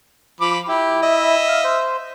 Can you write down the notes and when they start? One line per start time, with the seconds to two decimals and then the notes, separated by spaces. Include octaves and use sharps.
0.41 F3 B5 D6
0.68 E4 G4
1.02 D#5 E5
1.48 F5
1.64 C5